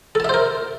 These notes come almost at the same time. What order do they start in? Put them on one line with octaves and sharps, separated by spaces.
A4 A5 E5 C5 A#4